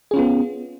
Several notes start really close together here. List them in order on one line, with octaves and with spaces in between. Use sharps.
G#4 C#4 F4 B3